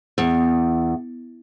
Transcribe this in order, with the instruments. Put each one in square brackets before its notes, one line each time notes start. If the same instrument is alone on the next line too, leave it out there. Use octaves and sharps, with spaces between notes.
[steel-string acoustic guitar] E2